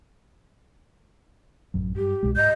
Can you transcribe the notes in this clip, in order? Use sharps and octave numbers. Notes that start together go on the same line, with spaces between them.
A1 F#2 F#3
G2 G4
C2 B2 G#3
G#2 D#5 G6